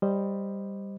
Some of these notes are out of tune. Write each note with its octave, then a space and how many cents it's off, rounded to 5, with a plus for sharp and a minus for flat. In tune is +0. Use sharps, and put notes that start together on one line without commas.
G3 +10 C5 +0 D#5 +0